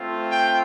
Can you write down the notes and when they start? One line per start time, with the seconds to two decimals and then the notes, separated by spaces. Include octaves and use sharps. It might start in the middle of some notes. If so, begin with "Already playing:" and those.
Already playing: A3 C4 F4
0.31 G5